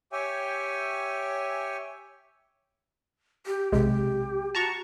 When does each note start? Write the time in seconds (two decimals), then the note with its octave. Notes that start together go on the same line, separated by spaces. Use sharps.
0.12 G4 C#5 E5 G5 G#5
3.47 G4
3.72 B1 C3 G#3 G4
4.55 F#4 A5 A#5 C#6